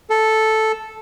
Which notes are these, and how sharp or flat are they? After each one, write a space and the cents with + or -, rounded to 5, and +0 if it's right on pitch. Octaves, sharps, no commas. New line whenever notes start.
A4 -5